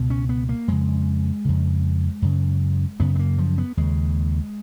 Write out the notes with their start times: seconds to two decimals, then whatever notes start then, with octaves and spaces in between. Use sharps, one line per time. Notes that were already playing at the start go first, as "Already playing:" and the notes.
Already playing: C#2 B2
0.10 C#4
0.29 B3
0.49 A#3
0.68 F2 C#3 G#3
1.45 F2 C#3
2.22 F#2 C#3
3.00 F#2 C#3 B3
3.16 B3
3.19 A#3
3.38 F3
3.58 B3
3.77 D#2 C#3 G#3